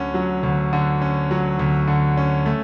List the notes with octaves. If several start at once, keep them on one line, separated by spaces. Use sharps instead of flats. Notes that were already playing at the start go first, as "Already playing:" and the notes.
Already playing: D2 D3 F#3 C#4
F#3
D2
D3
C#4
F#3
D2
D3
C#4
A3